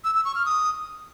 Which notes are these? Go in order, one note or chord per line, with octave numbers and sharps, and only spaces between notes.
E6
E6
C#6
F6
D#6